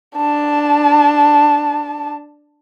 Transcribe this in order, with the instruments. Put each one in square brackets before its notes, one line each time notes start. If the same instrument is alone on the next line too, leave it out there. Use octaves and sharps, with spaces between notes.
[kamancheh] D4 A5